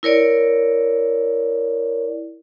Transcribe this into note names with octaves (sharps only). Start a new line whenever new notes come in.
E4 A#4 C#5 D5